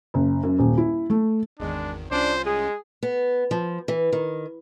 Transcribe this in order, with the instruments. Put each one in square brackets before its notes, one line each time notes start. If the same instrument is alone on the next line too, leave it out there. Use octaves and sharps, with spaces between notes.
[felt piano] F#1
F#2
D#1
E4
A3
[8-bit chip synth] G#1 E2 D#3 [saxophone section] G#3 [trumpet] D4
[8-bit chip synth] C2 C#4 F4 [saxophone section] D4 [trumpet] C5
[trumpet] G#3 [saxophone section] G#4
[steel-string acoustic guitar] B3
F3
E3
D#3